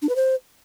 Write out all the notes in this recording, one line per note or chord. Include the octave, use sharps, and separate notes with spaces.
D4
B4
C5